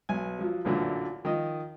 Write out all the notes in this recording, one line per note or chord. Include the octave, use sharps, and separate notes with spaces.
B1 G#5
F3 F#3
A1 F#2 A#2 D3 E3
D#3 F3 D#5